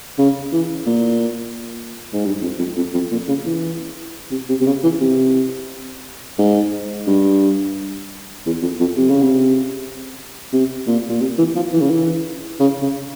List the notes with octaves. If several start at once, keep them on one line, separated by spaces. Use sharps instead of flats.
C#3
E3
A#2
G#2
G2
F2
F2
F2
F2
A#2
C#3
E3
C3
C3
C3
C#3
E3
C3
G#2
G2
E2
F2
F2
C3
C#3
C3
C3
A#2
A#2
C3
E3
F3
E3
C#3
E3
C#3
C#3